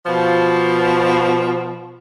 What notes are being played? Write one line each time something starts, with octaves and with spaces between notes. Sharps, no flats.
B2 F3